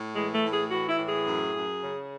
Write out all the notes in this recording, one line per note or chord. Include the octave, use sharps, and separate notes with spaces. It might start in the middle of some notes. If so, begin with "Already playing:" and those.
Already playing: A2
E3 G#3
A3
A2
G#4
E3 F#4
E4
A2
G#4
F#2
F#2
C#3